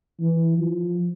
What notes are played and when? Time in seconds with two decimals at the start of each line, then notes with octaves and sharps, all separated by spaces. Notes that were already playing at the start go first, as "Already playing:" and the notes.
0.20 E3
0.58 F3